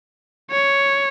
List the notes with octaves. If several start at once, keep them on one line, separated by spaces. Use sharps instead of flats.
C#5